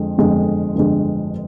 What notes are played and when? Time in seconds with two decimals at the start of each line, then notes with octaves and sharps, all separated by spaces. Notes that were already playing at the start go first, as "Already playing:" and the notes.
Already playing: F2 D3 G#3
0.18 G1 F2 D3 G#3
0.75 G1 F2 D3 G#3